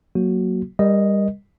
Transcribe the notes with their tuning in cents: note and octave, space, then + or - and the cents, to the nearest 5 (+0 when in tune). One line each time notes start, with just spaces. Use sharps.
F#3 +5 A#3 +0 F#4 +0
G3 +25 A#4 +20 D#5 +0